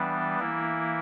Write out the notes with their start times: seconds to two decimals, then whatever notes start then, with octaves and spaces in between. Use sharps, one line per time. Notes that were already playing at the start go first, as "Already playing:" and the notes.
Already playing: E3 G3 B3 D4
0.39 E3 A#3 E4